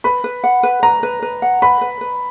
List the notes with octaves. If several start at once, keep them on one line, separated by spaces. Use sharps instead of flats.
B4 B5
B4
F#5
B4
B4 A#5
B4
B4
F#5
B4 B5
B4
B4